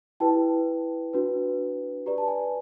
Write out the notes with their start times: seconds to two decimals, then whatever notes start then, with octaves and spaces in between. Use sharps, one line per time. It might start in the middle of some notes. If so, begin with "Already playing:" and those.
0.20 E4 G4 B4 G5 A5
1.13 D4 F#4 B4
2.06 G4 B4 D5 A#5
2.18 A5
2.28 G#5 A#5